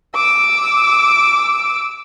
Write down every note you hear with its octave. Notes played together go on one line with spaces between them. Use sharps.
D6 E6